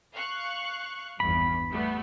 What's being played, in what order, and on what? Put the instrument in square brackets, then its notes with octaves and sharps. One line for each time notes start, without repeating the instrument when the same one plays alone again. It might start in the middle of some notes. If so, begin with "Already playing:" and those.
[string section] F5 C#6 F#6
[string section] G#1 E2 G2 [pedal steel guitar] B5
[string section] G3 A3 B3